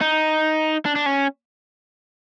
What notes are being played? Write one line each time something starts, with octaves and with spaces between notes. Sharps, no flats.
D#4
D4
D4
C#4